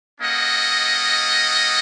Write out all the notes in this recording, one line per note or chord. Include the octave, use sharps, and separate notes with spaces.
A#3 C#4 A4 D#5 F#5